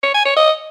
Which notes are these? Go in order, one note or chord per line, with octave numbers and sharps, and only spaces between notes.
C#5
G#5
C#5
D#5